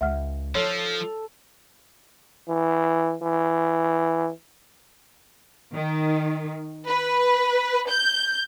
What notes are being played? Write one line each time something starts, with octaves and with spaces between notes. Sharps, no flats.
C#2 E5 F#5 F6
F3 D#4 A4 C#5
E3
E3
D#3
B4
G6